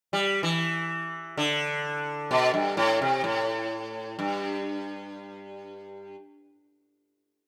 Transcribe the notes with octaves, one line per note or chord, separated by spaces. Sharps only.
G3
E3
D3
B2
G2
A2
C3
A2
G2